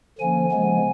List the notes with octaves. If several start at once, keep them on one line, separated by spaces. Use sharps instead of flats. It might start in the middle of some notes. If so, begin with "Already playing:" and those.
D3 F3 A#3 C#4 G#5
C#3 F3 G#3 B3